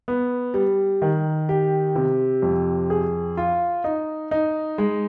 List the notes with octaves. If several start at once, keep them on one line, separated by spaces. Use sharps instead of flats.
B3
G3
D#3
G4
C3
F2
G#4
F4
D#4
D#4
G#3